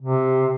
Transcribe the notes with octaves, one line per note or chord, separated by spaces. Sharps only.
C3